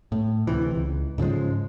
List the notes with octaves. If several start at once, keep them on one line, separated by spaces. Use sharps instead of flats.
A2
D2 C3 E3
C#2
G#2 C#3 F3 G#3